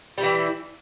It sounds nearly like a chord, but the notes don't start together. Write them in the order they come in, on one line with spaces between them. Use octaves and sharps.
G3 E4 E3